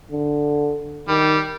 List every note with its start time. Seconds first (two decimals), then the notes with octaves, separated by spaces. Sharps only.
0.11 D3
1.08 D#3 G3